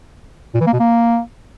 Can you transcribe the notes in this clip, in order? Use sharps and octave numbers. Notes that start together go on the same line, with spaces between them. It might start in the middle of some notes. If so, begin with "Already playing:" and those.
A#2
E3
A#3
B2
A#3